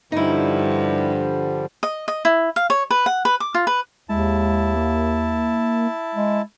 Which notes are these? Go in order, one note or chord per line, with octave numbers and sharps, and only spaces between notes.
G2 D3 F3 G3 D#4 E4
D#5
D#5
E4
F5
C#5
B4
F#5
B4
D6
F4
B4
D#2 G#3 E4 A5
A#3
G#3